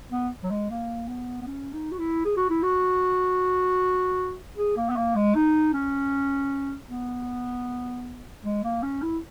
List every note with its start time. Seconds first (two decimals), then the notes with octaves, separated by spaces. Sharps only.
0.12 B3
0.43 F#3
0.51 G#3
0.70 A#3
1.08 B3
1.41 B3
1.47 C#4
1.73 D#4
1.92 F#4
1.99 E4
2.25 G#4
2.37 F#4
2.50 E4
2.63 F#4
4.57 G#4
4.77 A#3
4.90 B3
4.96 A#3
5.16 G#3
5.35 D#4
5.73 C#4
6.89 B3
8.44 G#3
8.64 A#3
8.83 C#4
9.02 E4